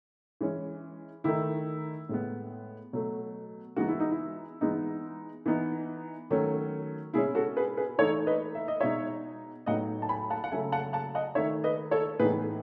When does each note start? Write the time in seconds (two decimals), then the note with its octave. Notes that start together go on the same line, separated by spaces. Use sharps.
0.41 E3 G#3 C#4
1.24 D#3 A3 D#4 E4
2.09 A2 G#3 B3
2.93 B2 F#3 A3
3.76 E3 G#3 B3 D#4 F#4
3.88 E4
4.00 D#4
4.11 E4
4.61 E3 G#3 B3 D#4
5.46 E3 B3 D#4
6.30 D#3 F#3 A3 C#4
7.14 B2 G#3 C#4 E4 G#4
7.35 F#4 A4
7.57 G#4 B4
7.77 G#4 B4
7.98 E3 A3 D#4 A4 C#5
8.27 B4 D#5
8.55 E5
8.68 D#5
8.80 B2 G#3 D#4 C#5 E5
9.66 A2 F#3 B3 D#4 D#5 F#5
10.02 A5
10.09 G#5 B5
10.30 F#5 A5
10.44 F#5
10.52 C#3 F#3 A3 E5 G#5
10.72 F#5 A5
10.93 F#5 A5
11.15 D#5 F#5
11.35 D#3 A3 D#4 C#5 E5
11.64 B4 D#5
11.91 A4 C#5
12.19 A2 E3 B3 D#4 G#4 B4